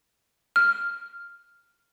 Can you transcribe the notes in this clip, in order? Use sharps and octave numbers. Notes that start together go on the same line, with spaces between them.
F6